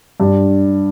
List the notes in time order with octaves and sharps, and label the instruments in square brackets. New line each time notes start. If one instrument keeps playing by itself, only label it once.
[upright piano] G2